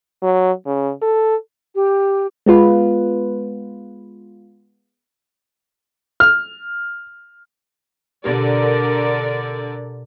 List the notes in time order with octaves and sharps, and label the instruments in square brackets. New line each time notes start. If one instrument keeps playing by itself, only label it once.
[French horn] F#3
C#3
A4
[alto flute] G4
[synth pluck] G#3 B3 F4 B4
[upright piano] F6
[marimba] B2 G4 [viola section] D3 A#4 D5